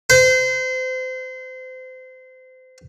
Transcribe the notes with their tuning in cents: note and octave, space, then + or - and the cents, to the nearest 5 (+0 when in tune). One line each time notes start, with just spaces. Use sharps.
C5 -30